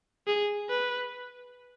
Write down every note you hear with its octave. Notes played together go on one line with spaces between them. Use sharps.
G#4
B4